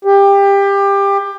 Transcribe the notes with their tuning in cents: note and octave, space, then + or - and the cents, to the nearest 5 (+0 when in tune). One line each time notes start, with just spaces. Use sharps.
G4 +20